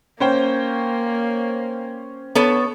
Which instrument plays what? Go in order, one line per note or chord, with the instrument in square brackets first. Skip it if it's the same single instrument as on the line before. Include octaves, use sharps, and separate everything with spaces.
[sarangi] A#3 [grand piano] C#4 C5 G5
[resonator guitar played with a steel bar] B3 A4 C#5